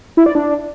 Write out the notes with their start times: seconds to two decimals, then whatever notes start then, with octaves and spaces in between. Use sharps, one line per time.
0.17 E4
0.26 D5
0.35 D4